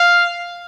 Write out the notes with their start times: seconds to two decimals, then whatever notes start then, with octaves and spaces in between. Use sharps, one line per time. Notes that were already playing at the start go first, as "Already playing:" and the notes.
Already playing: F5